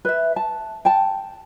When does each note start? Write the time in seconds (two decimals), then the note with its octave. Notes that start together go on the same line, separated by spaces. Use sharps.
0.05 B4 E5
0.36 A5
0.85 G5 A5